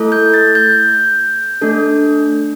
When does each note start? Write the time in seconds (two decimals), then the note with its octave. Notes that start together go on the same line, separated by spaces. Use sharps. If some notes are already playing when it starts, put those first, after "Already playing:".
Already playing: A3 E4 A4
0.12 G6
0.34 A6
0.55 G6
1.62 A3 D4 A4